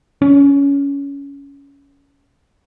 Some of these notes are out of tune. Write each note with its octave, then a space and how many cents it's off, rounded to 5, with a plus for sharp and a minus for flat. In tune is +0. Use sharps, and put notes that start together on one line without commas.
C#4 +20